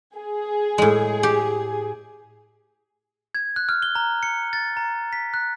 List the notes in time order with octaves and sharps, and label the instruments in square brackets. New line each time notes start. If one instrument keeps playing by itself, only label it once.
[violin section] G#4
[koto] A2 G#3
G4
[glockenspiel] G#6
F#6
F6
G7
A#5
C#7
A6
A#5
B6
F#6